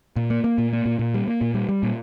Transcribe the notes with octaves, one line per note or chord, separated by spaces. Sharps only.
A#2
A#3
A#3
A#2
A#3
A#2
A#2
G3
A#3
A#2
G3
G3
A#2